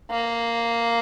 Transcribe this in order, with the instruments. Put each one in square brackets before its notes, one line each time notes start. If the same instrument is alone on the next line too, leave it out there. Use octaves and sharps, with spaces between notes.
[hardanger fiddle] A#3